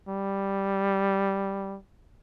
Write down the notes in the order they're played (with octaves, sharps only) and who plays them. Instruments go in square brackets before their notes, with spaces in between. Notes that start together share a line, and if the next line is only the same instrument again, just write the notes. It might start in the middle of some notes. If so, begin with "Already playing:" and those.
[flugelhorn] G3